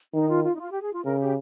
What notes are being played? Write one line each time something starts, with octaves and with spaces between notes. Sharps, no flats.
D#3 D#4
F4
F4
D#4
F4
G4
G#4
F4
C#3 A#4
G4